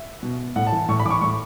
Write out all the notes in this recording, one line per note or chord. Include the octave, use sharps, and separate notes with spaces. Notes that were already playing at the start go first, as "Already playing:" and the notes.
Already playing: E5
B2
A2 F#5
A5
E3
A2 C#6
B5
E3 D6
C#6
A2 C#6